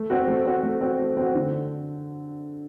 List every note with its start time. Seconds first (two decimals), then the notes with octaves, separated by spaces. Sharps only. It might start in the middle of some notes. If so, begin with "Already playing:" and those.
Already playing: A3
0.10 C4 F#4
0.28 A3
0.45 C4 F#4
0.63 A3
0.81 C4 F#4
0.99 A3
1.17 C4 F#4
1.35 D3